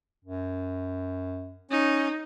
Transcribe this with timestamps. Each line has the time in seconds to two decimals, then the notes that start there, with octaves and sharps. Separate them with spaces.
0.25 F#2
1.70 C#4 D#4